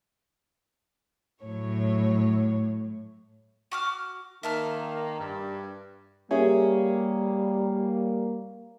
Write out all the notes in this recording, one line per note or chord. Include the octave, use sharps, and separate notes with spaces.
A2 F#3 C#5
F#4 D6 F6
D#3 A#3 E5 A5 F6
G2
G3 A#3 C#4 G4 G#4 E5